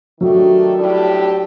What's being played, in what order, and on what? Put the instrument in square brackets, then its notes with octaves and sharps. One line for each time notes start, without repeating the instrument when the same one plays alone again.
[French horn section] D#3 A3 D4 G4 [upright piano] F#3
[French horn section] A2 G3 D4 G4